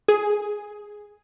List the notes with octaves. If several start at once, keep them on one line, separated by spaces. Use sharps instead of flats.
G#4